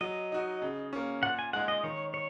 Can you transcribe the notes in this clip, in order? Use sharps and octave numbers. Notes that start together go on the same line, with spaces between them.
F#3 D#5
D#4 F#4
C#3
A#3 C#4
A#2 F#5
G#5
G#3 D#4 G#4 F#5
D#5
D#3 C#5
C#5